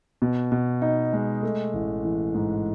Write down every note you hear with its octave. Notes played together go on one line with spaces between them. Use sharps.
B2
B2
D#4
G#3
A3
A1
E3
G#2